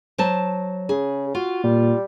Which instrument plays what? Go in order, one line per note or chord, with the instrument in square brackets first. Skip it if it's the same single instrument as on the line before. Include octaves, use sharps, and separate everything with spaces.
[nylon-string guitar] F#3 C5 A5
[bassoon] C#3 [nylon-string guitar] G#4
[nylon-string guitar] F4 [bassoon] F#4
[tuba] A#2 [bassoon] G3